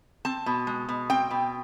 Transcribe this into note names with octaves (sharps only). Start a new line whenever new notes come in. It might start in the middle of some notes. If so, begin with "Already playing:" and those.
C4 A5
B2
G#3
B2
C4 G5
B2